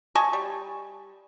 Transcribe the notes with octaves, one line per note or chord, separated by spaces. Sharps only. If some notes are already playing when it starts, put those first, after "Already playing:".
D#5 G#5 A5 C#6
G3